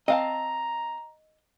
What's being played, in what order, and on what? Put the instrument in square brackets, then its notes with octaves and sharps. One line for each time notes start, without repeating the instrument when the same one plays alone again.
[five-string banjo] C4 F5 A5 [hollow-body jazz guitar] D#5 [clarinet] A#5